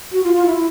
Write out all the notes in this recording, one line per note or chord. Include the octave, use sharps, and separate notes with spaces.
F#4
F4
F4
E4